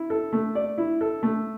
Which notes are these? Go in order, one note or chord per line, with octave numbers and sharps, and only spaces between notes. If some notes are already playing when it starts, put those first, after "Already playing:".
Already playing: E4
A4
A3
D5
E4
A4
A3